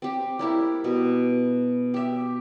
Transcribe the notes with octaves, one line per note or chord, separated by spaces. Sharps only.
C4 G4
G3 A#3 E4
B2
G4 E5